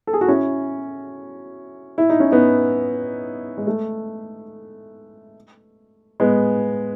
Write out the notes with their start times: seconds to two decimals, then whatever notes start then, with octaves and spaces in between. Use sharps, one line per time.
0.07 A4
0.13 G#4
0.21 F#4
0.28 C#4 E4
1.98 E4
2.10 D#4
2.20 C#4
2.31 B3 D#4
3.57 G#3
3.67 A3
6.20 G#3 B3